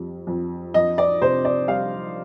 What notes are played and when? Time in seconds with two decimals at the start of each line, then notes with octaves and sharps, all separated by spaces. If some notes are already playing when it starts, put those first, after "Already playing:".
Already playing: F2 G3
0.27 F2
0.74 F2 D#5
0.98 D5
1.21 C3 C5
1.45 D5
1.67 G3 F5